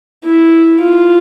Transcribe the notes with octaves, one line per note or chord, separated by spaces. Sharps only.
E4
F4